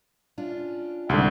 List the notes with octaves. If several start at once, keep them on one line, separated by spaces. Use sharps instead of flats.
C#4 D4 F4
C2 G#2 D3 G3 C4